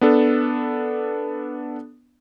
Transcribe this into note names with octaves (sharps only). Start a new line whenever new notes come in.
B3 D4 A4